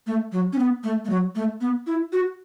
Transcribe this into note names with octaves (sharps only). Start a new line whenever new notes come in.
A3
F#3
C#4
B3
A3
A3
F#3
A3
B3
E4
F#4